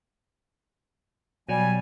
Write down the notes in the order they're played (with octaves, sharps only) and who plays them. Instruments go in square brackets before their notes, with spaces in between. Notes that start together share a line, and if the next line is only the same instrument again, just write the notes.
[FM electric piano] B2 F#3 [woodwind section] G3 G#5